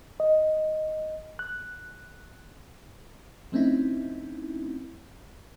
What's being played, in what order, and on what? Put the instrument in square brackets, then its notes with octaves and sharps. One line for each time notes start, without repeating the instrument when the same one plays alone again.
[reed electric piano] D#5
F#6
[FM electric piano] F3 A3 C4 C#4 D#4 E4